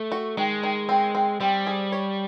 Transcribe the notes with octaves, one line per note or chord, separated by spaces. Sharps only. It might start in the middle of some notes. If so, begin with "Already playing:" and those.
Already playing: A3
F#4
D#3 G#3
D#3
C4
C4
G3 C4
G#4
C#5